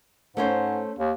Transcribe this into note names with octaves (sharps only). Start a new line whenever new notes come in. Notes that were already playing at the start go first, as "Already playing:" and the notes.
G#2 A3 C#4 C5
D#2